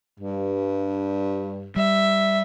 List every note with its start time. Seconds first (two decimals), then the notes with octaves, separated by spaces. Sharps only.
0.20 G2
1.76 G3 E5